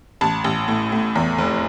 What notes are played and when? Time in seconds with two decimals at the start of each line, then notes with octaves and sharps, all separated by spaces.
0.21 A1 A5
0.44 A1
0.68 A2
0.92 A2
1.16 E2
1.38 F1